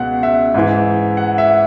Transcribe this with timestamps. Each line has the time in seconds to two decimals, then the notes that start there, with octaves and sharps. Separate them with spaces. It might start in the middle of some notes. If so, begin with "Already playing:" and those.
Already playing: C#2 B2 F#5
0.23 E5
0.54 G#2 E3
1.17 F#5
1.38 E5